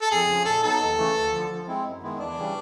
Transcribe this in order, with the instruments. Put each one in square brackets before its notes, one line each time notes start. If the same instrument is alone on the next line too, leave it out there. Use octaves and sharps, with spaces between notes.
[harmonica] A4
[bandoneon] F2 [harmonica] G#4
[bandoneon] C#3 F3
[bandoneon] A#2 [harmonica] A4
[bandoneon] F#3 B3 D#4 [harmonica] A4
[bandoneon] D#2
C#3 E3 A3
D2
D3 F3
F3
G#3 C4 E4
F#2
D#3 G#3 B3 E4
[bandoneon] E2 [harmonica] D4
[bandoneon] C#3 E3 G3